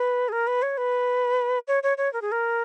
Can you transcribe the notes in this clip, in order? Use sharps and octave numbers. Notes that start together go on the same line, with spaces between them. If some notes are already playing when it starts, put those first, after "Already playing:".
Already playing: B4
G#4
A#4
B4
C#5
B4
C#5
C#5
C#5
A#4
G#4
A#4